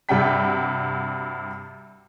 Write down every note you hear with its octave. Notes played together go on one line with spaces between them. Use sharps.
G2 C3 G3 F#4 G5 B6